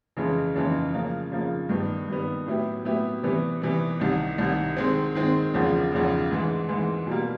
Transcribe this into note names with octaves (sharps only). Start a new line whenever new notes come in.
F2 C#3 E3 G#3
F2 C#3 E3 G#3
C#3 F3 A#3
C#3 F3 A#3
G2 D#3 G3 B3
G2 D#3 G3 B3
A2 F#3 B3 E4 G4
A2 F#3 B3 E4 G4
C3 E3 G3 B3
C3 E3 G3 B3
C2 C3 D#3
C2 C3 D#3
D#3 G#3 C4
D#3 G#3 C4
E2 C#3 F3 G#3
E2 C#3 F3 G#3
G#2 E3 G#3
G#2 E3 G#3
B2 G3 A#3